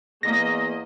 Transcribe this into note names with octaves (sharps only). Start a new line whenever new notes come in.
E2 A#3 D#5 A#6